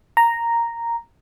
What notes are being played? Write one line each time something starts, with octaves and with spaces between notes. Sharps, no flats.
A#5